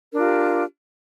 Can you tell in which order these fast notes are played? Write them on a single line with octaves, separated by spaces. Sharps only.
A#4 D4 F4 G4